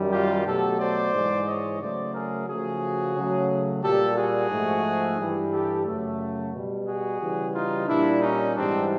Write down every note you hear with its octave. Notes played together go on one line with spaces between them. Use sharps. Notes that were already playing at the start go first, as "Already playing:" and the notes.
Already playing: F#2 D#3 G3
F4 G4
B2 F#3 A3 G4 A4
C5 D5
G#2 E3 G#3
C#5 D#5
C#3 F#3 A3 C5 D5
G#4 A#4
C#3 F3 A3 F#4 G#4
C#3 F#3 A3
A#2 G3 G4 A4
F#4 G#4
G#2 F3 A3
G2 E3 G3
G4 A4
F#2 C#3 F#3 A3
B2 G3
F#4 G#4
C#3 E3 G3
D#4 F4
A#2 G3 D4 E4
C#4 D#4
G#2 E3 G3 C4 D4